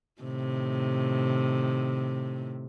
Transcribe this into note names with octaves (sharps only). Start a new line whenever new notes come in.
A2 C3 D#3